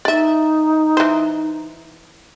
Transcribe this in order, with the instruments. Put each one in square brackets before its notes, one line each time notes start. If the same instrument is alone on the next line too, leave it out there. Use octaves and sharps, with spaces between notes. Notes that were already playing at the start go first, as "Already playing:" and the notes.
[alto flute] D#4 [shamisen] D5 E5
[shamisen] E3 C5